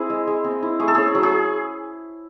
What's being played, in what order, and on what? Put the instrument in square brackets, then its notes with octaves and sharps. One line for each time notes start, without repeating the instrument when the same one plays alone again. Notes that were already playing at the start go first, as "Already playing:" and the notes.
Already playing: [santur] C4 E4 G#4
G#3
G#3
C4
E4
A3 G#4
A4
C#4 G#4
F#3
G#4